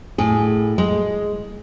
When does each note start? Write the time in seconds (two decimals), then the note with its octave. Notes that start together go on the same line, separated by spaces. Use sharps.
0.18 A2 G#4
0.78 G#3